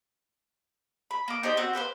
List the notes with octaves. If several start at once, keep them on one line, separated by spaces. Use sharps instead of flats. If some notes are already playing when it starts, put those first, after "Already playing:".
B5
A#3 D6
D#4 G4 C5 D5
C4 F#4 C5 F#5
G4 B4 C5 F5